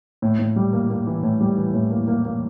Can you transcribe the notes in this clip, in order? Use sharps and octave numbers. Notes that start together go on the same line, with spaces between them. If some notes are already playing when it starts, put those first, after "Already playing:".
A2
A2
G3
A#3
A#3
E3
A2
G3
E3
A2
A#3
A#3
A#3